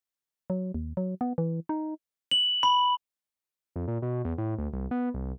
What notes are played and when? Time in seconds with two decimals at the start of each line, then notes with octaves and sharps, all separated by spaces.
0.50 F#3
0.74 D#2
0.97 F#3
1.21 B3
1.38 E3
1.69 D#4
2.31 F#7
2.63 B5
3.76 F2
3.88 A#2
4.02 B2
4.25 E2
4.38 A2
4.58 D2
4.73 C2
4.91 B3
5.14 C2